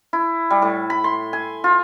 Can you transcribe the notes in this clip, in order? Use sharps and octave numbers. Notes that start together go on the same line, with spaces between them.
E4
G3
A2
B5
C6
G#5
F4